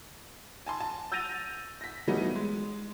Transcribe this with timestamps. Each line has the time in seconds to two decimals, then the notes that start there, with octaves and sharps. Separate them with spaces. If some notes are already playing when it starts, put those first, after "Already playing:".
0.66 G#5 A5 C6
0.80 A5
1.12 E6 G6 A6 A#6 D#7 F7
1.81 A#6 B6
2.07 E3 F#3 G3 A3 B3 D#4
2.36 G#3